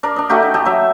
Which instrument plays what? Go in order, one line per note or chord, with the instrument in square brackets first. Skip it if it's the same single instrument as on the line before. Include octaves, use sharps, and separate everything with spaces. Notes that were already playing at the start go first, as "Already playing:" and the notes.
[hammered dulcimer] D4 A#4 D5
D4 D#5
A3 D#4 F#4 G4
D#4
G4 A4 D#5
F#3 E5